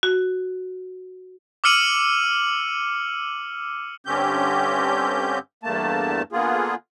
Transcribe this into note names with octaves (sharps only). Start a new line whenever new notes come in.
F#4
D6 E6 F6 C#7 D#7 F#7
G2 D3 C4 C#4 G4 G6
E2 G2 A3 A#3 A5
D3 A#3 B3 F4 G#4